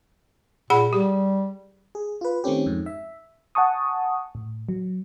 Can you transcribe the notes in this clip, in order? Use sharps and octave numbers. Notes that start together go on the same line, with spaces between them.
A#2 G#4 F#5 B5
G3 G4
G#4
F4 B4
D#3 A3 C4 C#4 G4
F2 G#2
E5
F#5 G#5 A5 C#6 D#6
A2
F#3